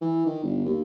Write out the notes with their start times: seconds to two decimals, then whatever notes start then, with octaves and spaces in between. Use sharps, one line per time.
0.01 E3
0.26 D#3
0.43 G1
0.65 D#2